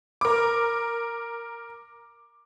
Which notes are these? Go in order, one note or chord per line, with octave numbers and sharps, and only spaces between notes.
A#4 D6